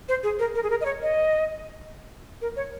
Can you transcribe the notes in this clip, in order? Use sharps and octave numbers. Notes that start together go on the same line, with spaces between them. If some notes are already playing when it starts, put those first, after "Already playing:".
C5
G#4
A#4
A#4
G#4
A#4
D#5
C#5
D#5
A#4
C#5